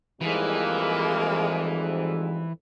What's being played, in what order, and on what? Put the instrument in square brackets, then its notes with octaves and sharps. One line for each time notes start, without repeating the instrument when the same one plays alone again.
[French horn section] F2 G#2 G3 [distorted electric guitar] E3 [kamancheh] G#3 A#3